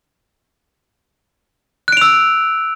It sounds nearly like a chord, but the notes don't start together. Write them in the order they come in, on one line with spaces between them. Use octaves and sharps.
F#6 D7 F7 E6